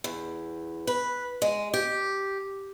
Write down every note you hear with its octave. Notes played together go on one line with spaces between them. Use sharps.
E2
B4
G#3
G4